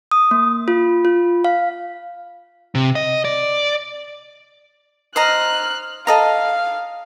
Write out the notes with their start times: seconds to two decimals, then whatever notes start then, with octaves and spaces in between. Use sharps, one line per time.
0.11 D#6
0.31 A#3
0.68 F4
1.05 F4
1.45 F5
2.75 C3
2.95 D#5
3.25 D5
5.16 C5 D#5 A#5 F6 F#6
6.07 A4 D#5 F5 A#5